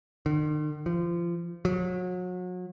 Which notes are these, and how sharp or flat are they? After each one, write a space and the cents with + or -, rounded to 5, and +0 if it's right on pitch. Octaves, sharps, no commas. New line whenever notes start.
D#3 -45
F3 -25
F#3 -35